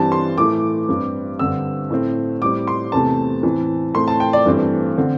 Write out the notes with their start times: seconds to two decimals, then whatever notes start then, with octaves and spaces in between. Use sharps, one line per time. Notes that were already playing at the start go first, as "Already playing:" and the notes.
Already playing: G2 E3 G3 C4 A5
0.12 C6
0.38 A2 E3 A3 D6
0.88 G2 G3 C4
1.39 G2 D3 C4 E6
1.90 A2 A3 C4
2.41 A2 G3 C4 D6
2.67 C6
2.92 E2 C3 A3 C4 A5
3.43 A2 E3 C4
3.94 A2 A3 C4 C6
4.08 A5
4.20 G5
4.33 D5
4.46 G2 E3 A3 C4
4.98 D3 C4